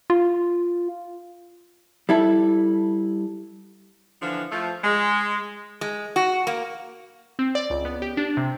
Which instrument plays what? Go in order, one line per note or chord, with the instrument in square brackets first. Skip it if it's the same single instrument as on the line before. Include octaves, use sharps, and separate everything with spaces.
[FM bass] F4
[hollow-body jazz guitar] G3 E4 A4
[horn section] D3 E3 F3
F3 A3
G#3
[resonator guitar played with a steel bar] G#3
F#4
A#3
[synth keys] C4
D5
C#2
B3
G4
D4
C3